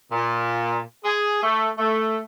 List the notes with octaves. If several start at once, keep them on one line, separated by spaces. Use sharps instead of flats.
A#2
G#4
A3
A3